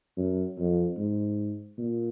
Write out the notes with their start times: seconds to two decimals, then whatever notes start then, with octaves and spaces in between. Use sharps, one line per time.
0.17 F#2
0.58 F2
0.98 G#2
1.78 A#2